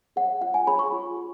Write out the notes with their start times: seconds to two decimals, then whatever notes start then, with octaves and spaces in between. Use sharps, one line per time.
0.16 G#4 C#5 F#5
0.41 F4 F#5
0.54 G#5
0.67 G#4 C#5 B5
0.79 C#6
0.92 F4
1.17 G#4